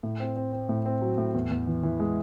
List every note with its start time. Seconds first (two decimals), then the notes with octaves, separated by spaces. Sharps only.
0.03 A2
0.20 C4
0.36 C4
0.53 C4
0.69 A2
0.86 C4
1.01 F#3
1.18 A2
1.34 E2
1.51 E2
1.67 E3
1.83 E3
2.00 G#3